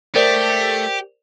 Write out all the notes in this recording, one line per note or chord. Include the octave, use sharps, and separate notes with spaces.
A3 G4 A#4 C5 D5